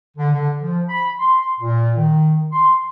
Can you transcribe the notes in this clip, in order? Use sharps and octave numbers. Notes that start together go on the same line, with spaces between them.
D3
D3
F3
B5
C6
A#2
D#3
C6